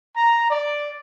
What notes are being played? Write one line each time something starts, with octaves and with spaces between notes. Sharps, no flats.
A#5
D5